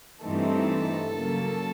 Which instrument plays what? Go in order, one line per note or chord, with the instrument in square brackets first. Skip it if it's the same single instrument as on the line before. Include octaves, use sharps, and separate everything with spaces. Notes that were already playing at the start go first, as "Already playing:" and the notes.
[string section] G2 E3 A3 C4 D#4 A4
C#3 F#3 A#3